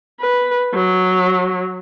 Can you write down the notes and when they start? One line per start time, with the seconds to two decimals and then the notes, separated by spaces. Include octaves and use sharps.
0.21 B4
0.75 F#3